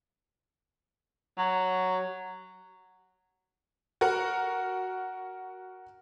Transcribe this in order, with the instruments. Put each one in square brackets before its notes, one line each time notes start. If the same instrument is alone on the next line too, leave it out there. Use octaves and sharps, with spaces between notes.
[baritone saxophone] F#3
[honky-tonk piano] F#4 A#4 F#5